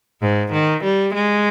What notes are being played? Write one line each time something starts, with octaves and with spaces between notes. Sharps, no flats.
G#2
D#3
G3
G#3